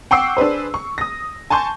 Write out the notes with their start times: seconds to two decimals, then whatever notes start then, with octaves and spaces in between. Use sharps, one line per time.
0.11 F#5 G5 C#6 D6 E6 C7
0.37 D4 G#4 B4 C5
0.74 C#6
0.98 D#6 A#6
1.50 G#5 A5 C6 C#6 G6